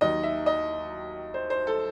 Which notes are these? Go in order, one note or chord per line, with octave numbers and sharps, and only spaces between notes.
D#2 D#3 F#3 D#5
E5
D#5
C5
C5
A4